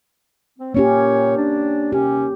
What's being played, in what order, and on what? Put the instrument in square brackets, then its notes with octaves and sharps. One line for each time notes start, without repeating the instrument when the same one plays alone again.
[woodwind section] C4
[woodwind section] A#2 C#5 [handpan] A#3 C#4 G4
[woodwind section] D4
[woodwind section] D#2 C3 C#4 [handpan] G4